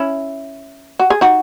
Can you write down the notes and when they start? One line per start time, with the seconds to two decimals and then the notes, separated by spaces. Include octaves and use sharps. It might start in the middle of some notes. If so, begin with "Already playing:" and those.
Already playing: C#4 E4
1.00 F#4
1.10 G#4
1.21 D#4 F#4